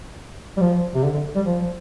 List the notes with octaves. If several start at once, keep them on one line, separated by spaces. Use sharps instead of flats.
G3
F3
C3
D3
D3
G3
F3